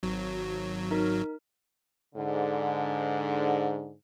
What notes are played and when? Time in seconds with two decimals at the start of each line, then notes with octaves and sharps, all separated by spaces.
0.03 G#1 F#3
0.91 D#4 A#4
2.15 G#2 D3